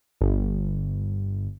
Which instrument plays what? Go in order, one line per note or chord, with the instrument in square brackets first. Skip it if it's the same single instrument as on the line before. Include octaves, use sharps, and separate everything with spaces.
[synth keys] G1